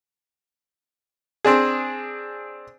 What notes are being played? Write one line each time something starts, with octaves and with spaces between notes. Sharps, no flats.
C4 D4 G#4